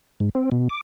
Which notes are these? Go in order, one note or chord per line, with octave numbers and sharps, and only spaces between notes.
G#2
C4
B2
D6